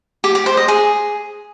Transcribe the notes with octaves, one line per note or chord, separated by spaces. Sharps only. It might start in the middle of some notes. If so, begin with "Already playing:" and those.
G4
G4
C5
D#5
G#4